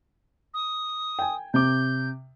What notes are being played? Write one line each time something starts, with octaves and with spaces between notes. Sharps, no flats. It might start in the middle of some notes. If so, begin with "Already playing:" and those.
D#6
G5 G#5
C3 D6 G6